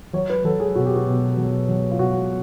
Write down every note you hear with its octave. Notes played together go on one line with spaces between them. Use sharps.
F#3 C#5
B4
F#3 A4
G#4
B2 F#4
G4
F#4
B2
F#3
F#3
F4
B2 F#4